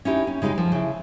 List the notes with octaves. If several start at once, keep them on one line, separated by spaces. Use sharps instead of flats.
C#4 D#4 E4 G4
C#4
C#3 G#3 D#4 F4 G4
F3
C#3 E4